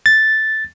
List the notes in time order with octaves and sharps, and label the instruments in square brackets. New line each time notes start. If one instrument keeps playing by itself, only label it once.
[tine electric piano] A6